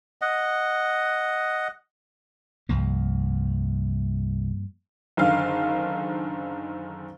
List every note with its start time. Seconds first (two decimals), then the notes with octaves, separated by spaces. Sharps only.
0.22 D#5 F#5
2.69 C2 G2 F3 A#3
5.17 F#1 D3 D#3 F5 F6